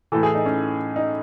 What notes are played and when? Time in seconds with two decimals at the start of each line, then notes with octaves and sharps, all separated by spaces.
0.12 A2 E3 A4
0.23 G#4
0.35 D#4
0.46 C#4
0.96 D#4